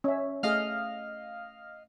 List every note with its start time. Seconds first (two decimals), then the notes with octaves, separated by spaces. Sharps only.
0.04 C#4 E5
0.43 A3 G#4 D#5 F5 F6